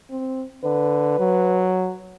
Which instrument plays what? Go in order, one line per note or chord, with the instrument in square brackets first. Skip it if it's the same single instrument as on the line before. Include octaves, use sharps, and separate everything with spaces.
[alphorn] C4
[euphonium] D3 [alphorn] B4
[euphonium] F#3